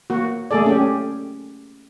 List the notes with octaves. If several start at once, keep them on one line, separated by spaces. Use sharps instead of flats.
A#3 F#4
A3 A#3 G#4 A4 D5
C#4 G4